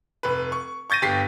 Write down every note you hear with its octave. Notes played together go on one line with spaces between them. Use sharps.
F1 B4
C#6
C#6 G6 A6 A#6 D#7
G1 G4 B6 C7